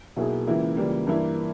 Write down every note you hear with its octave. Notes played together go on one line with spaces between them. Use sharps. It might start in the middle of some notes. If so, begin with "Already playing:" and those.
B1 B2 A#3 E4 G#4
C#2 C#3 E3 A#3 E4
C#2 C#3 E3 G3 A#3
G2 E3 A#3 E4